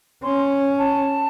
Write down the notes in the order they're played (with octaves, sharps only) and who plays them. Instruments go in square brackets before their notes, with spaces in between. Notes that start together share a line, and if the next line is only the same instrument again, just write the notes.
[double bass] C#4 [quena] C6
[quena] A5